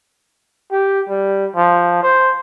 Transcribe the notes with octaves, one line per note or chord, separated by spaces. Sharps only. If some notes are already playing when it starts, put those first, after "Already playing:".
G4
G3
F3
C5